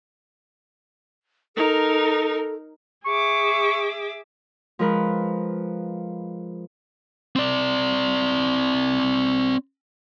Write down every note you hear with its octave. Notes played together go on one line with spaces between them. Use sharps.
D#4 A4 A#4
G#4 E5 C#6 D6
F3 G#3 A#4 B4
C4 D5